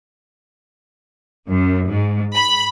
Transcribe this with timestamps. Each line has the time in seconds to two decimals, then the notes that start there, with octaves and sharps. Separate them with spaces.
1.48 F#2
1.88 G#2
2.35 B5